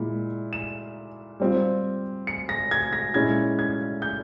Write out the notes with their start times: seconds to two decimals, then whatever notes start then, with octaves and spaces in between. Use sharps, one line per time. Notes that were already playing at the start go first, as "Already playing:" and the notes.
Already playing: A#2 G#3 E4
0.53 E7
1.40 G3 C4 F4
2.27 C#7
2.49 A#6
2.71 G#6
2.93 A#6
3.14 A#2 G#3 C#4 E4 G#6
3.59 G#6
4.02 G6